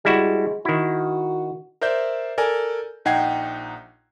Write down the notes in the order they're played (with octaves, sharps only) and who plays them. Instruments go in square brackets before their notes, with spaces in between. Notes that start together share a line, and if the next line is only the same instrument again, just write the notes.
[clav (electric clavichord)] G3 E4 F#4 [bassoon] G#3
[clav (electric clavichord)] D#3 E4 [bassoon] F#4
[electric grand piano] A#4 C5 D5 E5 G6
A4 A#4 D5 G#5
A#1 D#4 F#5 G5 G#6 C7